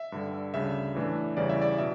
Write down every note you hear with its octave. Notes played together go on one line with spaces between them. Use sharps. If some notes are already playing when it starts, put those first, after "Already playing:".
Already playing: E5
G2 D3 G3
D2 C#3 G3 D4 E5
A2 E3 A3 D4
E2 C#3 E3 G3 C#4 D5
E5
D5
B2 E5